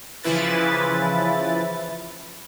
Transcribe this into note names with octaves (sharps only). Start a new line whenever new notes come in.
C#3 E3 F3 E4 B4 A6